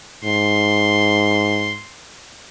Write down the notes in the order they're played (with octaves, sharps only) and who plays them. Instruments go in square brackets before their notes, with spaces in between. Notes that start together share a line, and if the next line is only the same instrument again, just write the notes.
[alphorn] G#2 [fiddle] C6